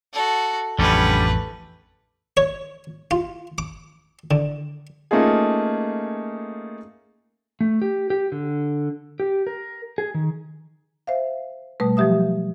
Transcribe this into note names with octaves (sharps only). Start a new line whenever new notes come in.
F#4 A4
A1 F2 D3 G3 A3 C#4 B4
C#5
F4
D6
D3
A3 A#3 C#4 D#4 F4 G#4
A3
G4
G4
D3
G4
A#4
G#4
D#3
C5 E5 F5
B2 G3 A3 B4
F3 F#3 G4 E5 D#6